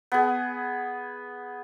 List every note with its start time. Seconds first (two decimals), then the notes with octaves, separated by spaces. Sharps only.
0.12 B3 G#4